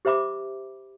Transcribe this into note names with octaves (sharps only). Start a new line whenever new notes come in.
G4 C5 E5 B5 D6